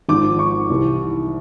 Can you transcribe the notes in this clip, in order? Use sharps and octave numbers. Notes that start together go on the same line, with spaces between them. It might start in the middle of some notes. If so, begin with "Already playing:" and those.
G#1 G#2 F3 D6
C#6
C2 C3 E3